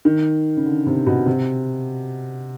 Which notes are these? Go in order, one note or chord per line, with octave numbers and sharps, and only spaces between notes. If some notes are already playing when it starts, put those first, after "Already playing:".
D#3
C#3
D3
C3
B2
C3